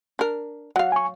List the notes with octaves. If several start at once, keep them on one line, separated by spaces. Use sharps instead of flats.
D4 A#4
F#3 F5 F#5
G#5 C#6